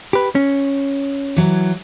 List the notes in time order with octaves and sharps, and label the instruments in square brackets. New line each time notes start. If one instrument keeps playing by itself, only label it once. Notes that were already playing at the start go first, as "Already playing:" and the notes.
[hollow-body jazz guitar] G4 B4
C#4
[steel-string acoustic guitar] E3 F#3